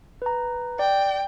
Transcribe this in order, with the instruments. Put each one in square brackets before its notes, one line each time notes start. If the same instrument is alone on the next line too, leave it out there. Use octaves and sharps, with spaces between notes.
[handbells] B4 A#5
[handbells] D5 [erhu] G5